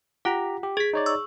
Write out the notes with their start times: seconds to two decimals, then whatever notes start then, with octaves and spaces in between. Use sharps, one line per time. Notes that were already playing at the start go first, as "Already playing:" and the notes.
0.25 F4 G4 F#5 A#5
0.63 G4
0.77 G#4 G#6 B6
0.93 D#4 C#5 D5
1.06 C#6 E6